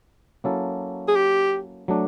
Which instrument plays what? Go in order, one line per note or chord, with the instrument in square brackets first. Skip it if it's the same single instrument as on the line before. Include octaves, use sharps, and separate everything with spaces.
[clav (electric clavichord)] F#3 A#3 C#4 E4 A4
[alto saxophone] G#4
G4
[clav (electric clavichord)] F#3 A3 D4